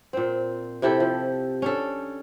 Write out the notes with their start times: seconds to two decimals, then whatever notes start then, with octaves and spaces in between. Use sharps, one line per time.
0.13 A#2 C4
0.82 C3 E4 G4 A4
1.00 F3
1.62 C#4 D4 A4